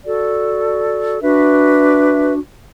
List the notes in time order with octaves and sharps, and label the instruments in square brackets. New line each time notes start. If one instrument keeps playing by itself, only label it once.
[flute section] F#4 A4 D5
D4 F#4 B4 E5